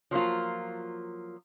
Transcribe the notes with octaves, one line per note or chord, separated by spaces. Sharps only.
F3 F#3 A#3 F4